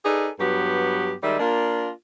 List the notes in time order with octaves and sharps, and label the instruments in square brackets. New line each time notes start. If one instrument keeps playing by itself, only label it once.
[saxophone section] D#4 G#4 A4 B4 D5
G2 F#3 B3 G4
D#3 G3 G#3 D5 E5
A#3 D4 F4 A#4